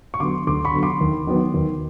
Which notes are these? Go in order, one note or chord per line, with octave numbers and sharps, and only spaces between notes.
C#6
D3 F#3 B3 C6 D6
D2 C6 D6
B5 C#6
D3 F#3 B3
C6 D6
D#2
D#3 F#3 B3
D#2